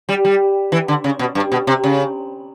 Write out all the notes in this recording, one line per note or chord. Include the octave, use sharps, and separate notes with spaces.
G3
G3
E3
D3
C#3
B2
G2
B2
C3
C#3